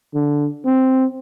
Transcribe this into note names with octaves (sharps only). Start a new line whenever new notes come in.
D3
C4